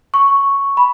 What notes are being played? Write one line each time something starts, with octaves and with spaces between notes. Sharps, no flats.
C#6
B5